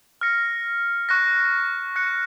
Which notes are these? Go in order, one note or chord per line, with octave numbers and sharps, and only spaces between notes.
F6 A#6 C#7
C#6 F#6 A#6
F#6 A#6 C#7